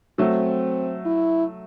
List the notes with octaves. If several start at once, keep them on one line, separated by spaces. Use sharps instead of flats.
F#3 A3 C4
E4